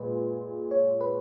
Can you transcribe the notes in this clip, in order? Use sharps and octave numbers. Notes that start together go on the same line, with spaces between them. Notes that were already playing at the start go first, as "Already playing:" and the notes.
Already playing: A#2 G#3 B4 D#5
C#5
B4